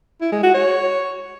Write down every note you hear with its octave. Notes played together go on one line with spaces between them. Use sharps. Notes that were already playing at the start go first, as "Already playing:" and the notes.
E4
G#3
F#4
C#5